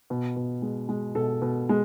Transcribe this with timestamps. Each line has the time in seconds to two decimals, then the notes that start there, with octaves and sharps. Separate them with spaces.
0.10 B2
0.36 B2
0.62 G#3
0.89 G#3
1.15 B2 A4
1.42 B2
1.69 G#3